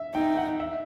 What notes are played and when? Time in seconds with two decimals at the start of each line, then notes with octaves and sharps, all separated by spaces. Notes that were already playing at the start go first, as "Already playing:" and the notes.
Already playing: E5
0.14 D#4 G5
0.37 F#5
0.60 E5